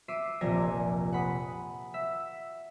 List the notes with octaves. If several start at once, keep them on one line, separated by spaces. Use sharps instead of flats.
E5 D6 C7 D7 D#7
F1 A#1 C3 D5 G#5 A#6
F#5 B5 D#6
E5